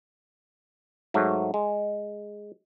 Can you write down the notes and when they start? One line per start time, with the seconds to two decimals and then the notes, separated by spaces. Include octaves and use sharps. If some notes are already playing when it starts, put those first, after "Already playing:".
1.14 G#2 F#3 A3
1.54 G#3